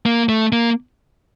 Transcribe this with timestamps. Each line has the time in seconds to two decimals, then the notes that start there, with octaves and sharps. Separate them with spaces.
0.06 A#3
0.29 A3
0.52 A#3